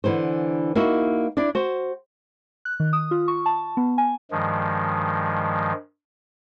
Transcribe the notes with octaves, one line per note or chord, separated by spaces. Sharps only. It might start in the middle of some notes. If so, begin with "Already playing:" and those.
D3 E3 B3 C5
A#3 D#4 E4 F#4
D4 E4 D5
F#4 C5
F#6
D#3
D#6
F4
C#6
A5
B3
G#5
G2 D#3 F3 G#3